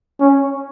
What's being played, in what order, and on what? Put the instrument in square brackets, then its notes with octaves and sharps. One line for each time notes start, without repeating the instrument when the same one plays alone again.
[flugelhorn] C#4